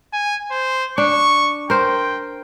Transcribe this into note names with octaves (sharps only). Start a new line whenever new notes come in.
G#5
C5
D4 C#6
A#4 C5 G5